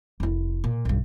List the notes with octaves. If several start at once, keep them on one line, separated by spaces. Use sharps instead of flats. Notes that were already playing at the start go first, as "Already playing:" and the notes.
F1 E4
A#2
B1 G2